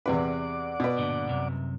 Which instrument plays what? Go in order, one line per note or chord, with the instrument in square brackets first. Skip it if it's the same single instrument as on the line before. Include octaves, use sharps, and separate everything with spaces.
[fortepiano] E2 C3 B4 [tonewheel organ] D5 F#5 D6
[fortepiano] B2 B4
[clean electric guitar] G2 A#2 D3
C2 F#2 C3